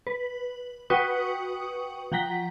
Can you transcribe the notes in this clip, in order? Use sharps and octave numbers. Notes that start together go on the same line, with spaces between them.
B4
F#4 B4 G5 C#6 D#6
F3 F#5 G5 A#5 B6